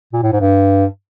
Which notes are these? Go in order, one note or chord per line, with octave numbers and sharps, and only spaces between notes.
A#2
A2
G#2
G2